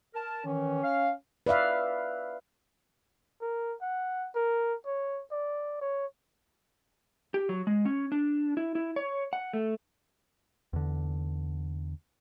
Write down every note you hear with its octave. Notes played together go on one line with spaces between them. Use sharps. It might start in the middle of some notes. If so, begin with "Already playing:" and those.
A#4 A5
D#3 E3 C#4
F5
B4 D5 E5 F5
A#4
F#5
A#4
C#5
D5
C#5
G4
F#3
G#3
C#4
D4
E4
E4
C#5
F#5
A3
E2 D3